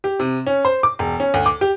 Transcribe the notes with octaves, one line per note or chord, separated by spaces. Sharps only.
G4
C3
C#4
C5
D6
E1
C#4
D2
D6
G4